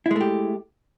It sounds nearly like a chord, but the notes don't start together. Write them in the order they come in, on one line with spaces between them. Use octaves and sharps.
E4 G#3 A3 G4